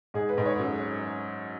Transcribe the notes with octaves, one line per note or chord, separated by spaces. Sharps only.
G#2 G#4
B4
G#2
C#5
F#2